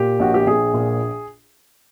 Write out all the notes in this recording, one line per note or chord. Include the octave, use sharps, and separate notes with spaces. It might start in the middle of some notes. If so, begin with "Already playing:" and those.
Already playing: A#2 G4
A#1 F#4
G4
A#1 G#4
A#2